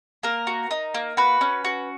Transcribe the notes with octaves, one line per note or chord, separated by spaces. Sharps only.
A#3 A#4
F#4
D#4
A#3
F#4 B4
C#4
F#4